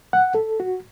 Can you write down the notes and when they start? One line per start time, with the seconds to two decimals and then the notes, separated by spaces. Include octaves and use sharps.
0.13 F#5
0.35 A4
0.60 F#4